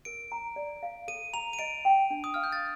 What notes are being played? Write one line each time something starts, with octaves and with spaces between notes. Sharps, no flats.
A#4 D7
A#5
D5
F5
A4 D#7
A#5 F7
D#7
D#5 D7
G5
D4
D#6
F5 F6
G6
A6